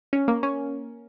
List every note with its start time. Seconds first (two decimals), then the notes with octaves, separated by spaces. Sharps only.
0.13 C#4
0.28 A#3
0.43 C#4